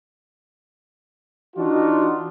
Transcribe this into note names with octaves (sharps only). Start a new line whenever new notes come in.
E3 D4 D#4 F4 F#4